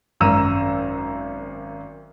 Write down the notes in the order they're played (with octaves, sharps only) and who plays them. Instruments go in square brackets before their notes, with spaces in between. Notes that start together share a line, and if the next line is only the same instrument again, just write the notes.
[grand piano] G#1 F#2 A#5 E6 D#7